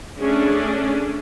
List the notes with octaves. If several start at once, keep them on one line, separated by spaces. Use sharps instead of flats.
A3 C#4 D4 G#4